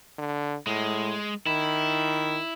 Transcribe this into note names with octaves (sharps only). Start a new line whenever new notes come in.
D3
A2 G#3
D#3 E4